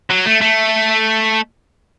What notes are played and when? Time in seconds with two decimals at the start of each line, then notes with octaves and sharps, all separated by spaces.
0.10 F#3
0.26 A3
0.41 A3